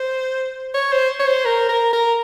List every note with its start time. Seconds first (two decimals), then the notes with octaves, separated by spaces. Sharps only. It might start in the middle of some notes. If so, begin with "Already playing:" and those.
Already playing: C5
0.74 C#5
0.92 C5
1.20 C#5
1.27 C5
1.45 A#4
1.69 A#4
1.93 A#4